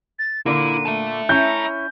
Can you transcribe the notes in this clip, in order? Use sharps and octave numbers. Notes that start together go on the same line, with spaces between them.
A6
A#2 D3 A#3 E4 D#7
E5 A5
C#4 E4 A#5 G6